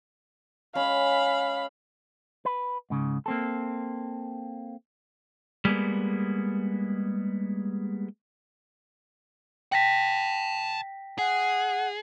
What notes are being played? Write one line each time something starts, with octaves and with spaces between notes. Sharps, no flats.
G#3 C#4 G#4 F5 B5
B4
G#2 C#3
A#3 C4 A4
G3 G#3 A#3 B3
F#5 G5 A5 A#6 B6
G#4 F#5